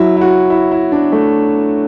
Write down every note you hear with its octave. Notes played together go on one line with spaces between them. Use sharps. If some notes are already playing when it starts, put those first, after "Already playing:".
Already playing: F#3 E4
E4
F#4
E4
E4
D4
A3